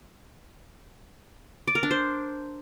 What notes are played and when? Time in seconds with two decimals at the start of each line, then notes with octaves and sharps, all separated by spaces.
1.67 D5
1.75 A#4
1.83 D4
1.91 C5